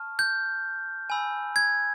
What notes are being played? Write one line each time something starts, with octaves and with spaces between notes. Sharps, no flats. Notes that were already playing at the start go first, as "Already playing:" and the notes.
Already playing: A5 C#6 F6
G6
G#5 B5 E6
G#6